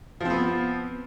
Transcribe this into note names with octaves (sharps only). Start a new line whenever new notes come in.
F3 B3 C4